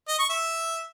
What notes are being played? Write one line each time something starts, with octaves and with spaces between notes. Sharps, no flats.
D#5
C#6
E5